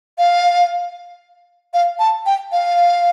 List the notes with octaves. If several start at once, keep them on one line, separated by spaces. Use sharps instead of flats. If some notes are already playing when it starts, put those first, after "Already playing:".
F5
F5
A5
G5
F5